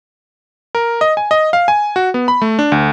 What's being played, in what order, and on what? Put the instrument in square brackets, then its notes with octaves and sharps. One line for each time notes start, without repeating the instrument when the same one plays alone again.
[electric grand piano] A#4
D#5
G#5
D#5
F5
G#5
F#4
B3
B5
A3
D4
D2